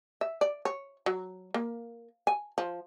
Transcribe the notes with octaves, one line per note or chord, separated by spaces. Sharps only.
E5
D5
C#5
F#3
A#3
G#5
F3